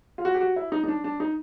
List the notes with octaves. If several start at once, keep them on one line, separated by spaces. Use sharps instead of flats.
F4
F#4
G4
F#4
E4
D#4
D#4
D4
D4
D#4